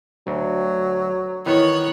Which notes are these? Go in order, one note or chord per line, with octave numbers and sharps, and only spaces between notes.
D2 F#3
D#3 E3 B3 C#5 F#6